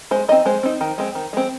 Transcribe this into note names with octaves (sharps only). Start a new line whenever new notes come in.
G#3 C5
C4 D#4 D#5
G#3 C5
C4 D#4
D#3
G#3 C4
D#3
G#3 C4